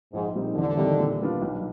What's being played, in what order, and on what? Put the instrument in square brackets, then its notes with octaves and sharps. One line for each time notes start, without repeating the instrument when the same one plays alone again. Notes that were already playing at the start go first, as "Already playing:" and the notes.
[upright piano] A#1 [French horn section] G#2
[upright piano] A#2 G3 C4 D#4
[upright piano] E2 [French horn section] D3
[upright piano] C3 D#3 G3
A#2
G3 B3 D4 F4
B1